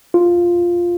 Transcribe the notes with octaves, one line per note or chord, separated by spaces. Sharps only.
F4